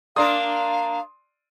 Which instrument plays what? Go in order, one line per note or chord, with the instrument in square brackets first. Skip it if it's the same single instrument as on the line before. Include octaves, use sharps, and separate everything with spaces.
[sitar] A#3 D4 A#4 [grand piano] D5 C6 D#6 [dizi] F5